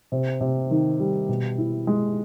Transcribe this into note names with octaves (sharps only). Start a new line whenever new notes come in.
C3
C3
D#3
G3
B2
E4
G#3